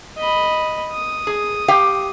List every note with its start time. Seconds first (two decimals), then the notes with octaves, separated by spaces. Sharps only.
0.18 D#5 B5
0.93 D#6
1.27 G#4
1.68 G4 F5 G5